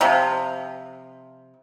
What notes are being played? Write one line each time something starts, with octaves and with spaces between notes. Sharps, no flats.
C3 F3